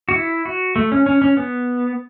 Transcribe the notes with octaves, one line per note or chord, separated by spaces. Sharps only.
F#4
E4
F#4
A3
C#4
C#4
C#4
B3